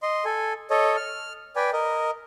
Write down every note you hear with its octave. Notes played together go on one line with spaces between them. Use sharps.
D#5 C6
A4 G#5
A4 C#5 D#5
F6
B4 D5 G5 G#5
A#4 D#5